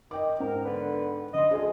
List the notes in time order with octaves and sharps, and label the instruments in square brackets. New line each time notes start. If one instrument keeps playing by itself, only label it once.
[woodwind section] D#3 [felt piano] D#5 G5 D6
[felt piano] G#2 G5 [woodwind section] A#4
[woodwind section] D3 B3 B4
[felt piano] D3 C6 [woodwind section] D#5
[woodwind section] D2 [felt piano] G#4 D#5